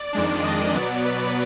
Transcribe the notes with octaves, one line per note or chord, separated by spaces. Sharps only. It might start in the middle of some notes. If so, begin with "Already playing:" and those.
Already playing: D5
F2 D#3 G#3 D4
D#5
B2 F#3 B3 D5
B4